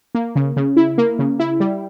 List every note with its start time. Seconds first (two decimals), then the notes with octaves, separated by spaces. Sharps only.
0.15 A#3
0.36 C#3
0.57 C#3
0.76 E4
0.98 A#3
1.19 C#3
1.39 E4
1.60 G3